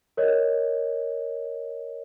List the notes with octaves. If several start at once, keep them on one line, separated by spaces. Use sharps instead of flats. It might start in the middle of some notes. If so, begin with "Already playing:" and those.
A#4 C#5 D#5